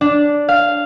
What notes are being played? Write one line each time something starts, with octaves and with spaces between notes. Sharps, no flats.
D4
F5